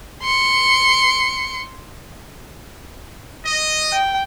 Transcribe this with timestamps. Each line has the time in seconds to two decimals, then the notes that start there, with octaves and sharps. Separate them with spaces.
0.23 C6 C#7
3.44 D#5
3.93 G5